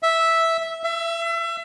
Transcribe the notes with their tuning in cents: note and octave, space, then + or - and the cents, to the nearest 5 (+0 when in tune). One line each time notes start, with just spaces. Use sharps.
E5 -5
E5 +30